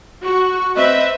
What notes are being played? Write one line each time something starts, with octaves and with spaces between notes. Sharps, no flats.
F#4 C#6
C4 B4 D#5 E5